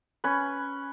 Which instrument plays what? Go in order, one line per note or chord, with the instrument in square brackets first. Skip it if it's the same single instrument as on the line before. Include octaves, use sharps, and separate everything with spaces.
[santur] C#4 B4